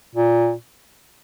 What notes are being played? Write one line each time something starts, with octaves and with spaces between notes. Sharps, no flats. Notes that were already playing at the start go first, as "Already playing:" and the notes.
A#2